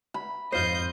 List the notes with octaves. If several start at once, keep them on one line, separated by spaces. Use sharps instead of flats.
B5
F2 G#2 F4 C5 D#5 G6